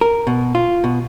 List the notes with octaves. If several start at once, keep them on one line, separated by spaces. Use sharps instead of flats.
A#4
B2
F4
B2